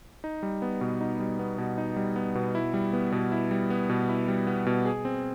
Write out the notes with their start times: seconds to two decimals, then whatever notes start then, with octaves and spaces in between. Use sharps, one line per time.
0.24 D#4
0.43 G3
0.62 B3
0.81 B2
1.01 D#4
1.20 G3
1.39 B3
1.58 B2
1.78 D#4
1.96 G3
2.16 B3
2.35 B2
2.55 E4
2.74 G3
2.93 B3
3.12 B2
3.32 E4
3.51 G3
3.70 B3
3.90 B2
4.09 E4
4.28 G3
4.47 B3
4.66 B2
4.85 G#4
5.05 C4